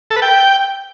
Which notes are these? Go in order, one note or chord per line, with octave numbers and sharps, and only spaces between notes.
A4
B4
G5